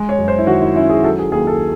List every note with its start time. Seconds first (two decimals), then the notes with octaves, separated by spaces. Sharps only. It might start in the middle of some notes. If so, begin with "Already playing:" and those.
Already playing: G#3
0.09 C#5
0.19 F#2
0.28 C5
0.38 E4
0.47 D#3 F#4
0.62 E4
0.75 C#4 E4
0.90 G#4
1.03 F#3 A4
1.19 G#4
1.32 D#2 G#4
1.47 A4